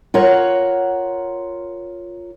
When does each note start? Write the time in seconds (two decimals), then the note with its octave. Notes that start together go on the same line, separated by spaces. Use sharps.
0.14 F4 A#4 C#5 F#5